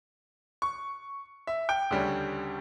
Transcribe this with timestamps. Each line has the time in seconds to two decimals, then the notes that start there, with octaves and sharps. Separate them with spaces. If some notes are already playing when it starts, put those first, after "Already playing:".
0.62 C#6
1.47 E5
1.69 G5
1.91 D2 C#3 G3 C#4